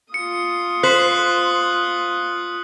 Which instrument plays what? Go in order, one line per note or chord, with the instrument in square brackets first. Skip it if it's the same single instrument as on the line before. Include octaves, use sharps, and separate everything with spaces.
[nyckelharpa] F4 D#6 [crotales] C#7
[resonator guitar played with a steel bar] C5 [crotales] F#6 B6 F#7